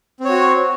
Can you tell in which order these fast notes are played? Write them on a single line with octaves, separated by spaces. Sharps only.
C4 C#5 F#4